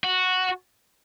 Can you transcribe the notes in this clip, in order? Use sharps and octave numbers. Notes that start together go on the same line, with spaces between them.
F#4